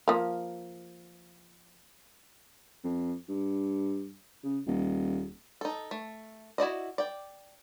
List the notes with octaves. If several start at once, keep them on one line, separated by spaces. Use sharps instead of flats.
F3 A#3
F2
G2
C#3
D#1
D#4 A4
A3
E4 F#4 D5 D#5
D5 G5